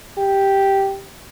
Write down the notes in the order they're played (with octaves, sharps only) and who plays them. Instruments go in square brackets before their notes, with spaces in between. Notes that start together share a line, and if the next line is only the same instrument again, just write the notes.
[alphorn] G4